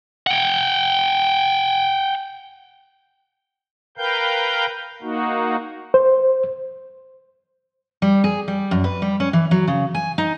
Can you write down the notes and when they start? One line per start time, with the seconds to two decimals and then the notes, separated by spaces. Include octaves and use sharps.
0.27 F#5 G5
3.97 A#4 B4 F5 G5 G6
5.02 A#3 D#4 F#4
5.94 C5
8.02 G3
8.24 G#4
8.48 G3
8.71 F#2
8.84 B4
9.02 G3
9.20 C#4
9.33 E3
9.51 F#3
9.67 C#3
9.94 G#5
10.18 D#4